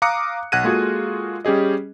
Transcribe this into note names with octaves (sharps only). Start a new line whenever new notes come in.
F5 A#5 D6 D#6 F#6 C#7
B1 F#5 F#6 G#6 A#6 D#7
G#3 A#3 F4 F#4 G#4 A4
G3 C#4 G4 G#4 D#5